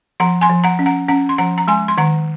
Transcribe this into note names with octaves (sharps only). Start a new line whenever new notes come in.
F3 F#5 A#5
G#5 C6
F3
F#5 A#5
C#4
F#5 A#5
C#4 F#5 A#5
C6
F3 F#5 A#5
A#5
G#3 G#5 C6
C6
D#3 F#5 A#5